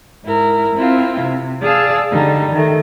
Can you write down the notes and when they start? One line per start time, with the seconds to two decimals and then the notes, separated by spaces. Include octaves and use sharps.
0.24 G#2 E4 A#4
0.74 C4 E4 F4
1.20 C3
1.62 G#4 D5 F5 A5 E6
2.12 D3 G3 D#4
2.52 D#3 A3